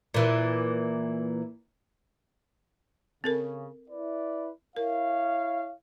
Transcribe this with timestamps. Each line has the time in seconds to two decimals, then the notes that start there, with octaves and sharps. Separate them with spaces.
0.14 A#2 E3
3.24 C#3 C4 A4 A#4
3.89 E4 B4 D5
4.76 E4 A#4 C#5 F5